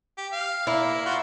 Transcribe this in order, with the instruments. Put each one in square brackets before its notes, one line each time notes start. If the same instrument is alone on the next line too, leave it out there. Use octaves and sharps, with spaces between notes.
[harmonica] G4
F5
[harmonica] A#3 [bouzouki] E4
[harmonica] F4 F#4